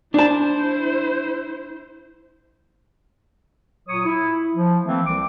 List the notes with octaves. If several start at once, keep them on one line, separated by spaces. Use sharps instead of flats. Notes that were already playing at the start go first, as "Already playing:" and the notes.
D4 E4 C5 A5
A#2 F#3 C#5 D#6
E4
F3
E3 A3 A#3 C4
C2 C4 D6